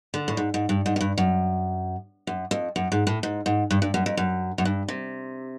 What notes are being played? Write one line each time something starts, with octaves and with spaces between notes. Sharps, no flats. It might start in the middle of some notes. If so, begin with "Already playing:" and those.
D3
A2
G#2
G#2
G2
G#2
F#2
G2
F#2
F#2
F2
F#2
G#2
A2
G#2
G#2
G2
G2
F#2
F2
F#2
F#2
G2
C3